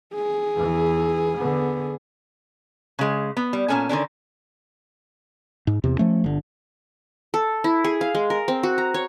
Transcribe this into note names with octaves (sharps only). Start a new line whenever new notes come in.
G#4
E2 E3
D3 B3
C#3 G#3
B3
G3
A#2 C4 C#4 A4 G#5
D3 D#3 C#4 D4
G#2
E2 C3
F3 A3 C#4
G1 D3
A4
E4
G#4
F5
G#3
A#4
C4
F#4
A#5
C#5